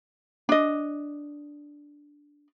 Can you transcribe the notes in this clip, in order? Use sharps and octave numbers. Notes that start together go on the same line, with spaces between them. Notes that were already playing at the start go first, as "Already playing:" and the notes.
D4 D#5